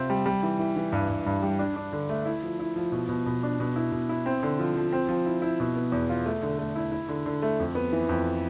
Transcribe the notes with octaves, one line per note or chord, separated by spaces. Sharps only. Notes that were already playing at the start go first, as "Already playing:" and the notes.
Already playing: C3 C4 F4
G3
G3
E3
E3
E3
G2
G2
G2
G3
D4
D4
D3
A3
E4
F3
E4
F3
B2
B2
B2
D4
B2
E4
B2
E4
C4
D3
F3
F3
C4
F3
E4
E4
B2
B3
E2
F4
A3
D3
A3
E4
E4
D3
D3
A3
F2
B3
E3
F2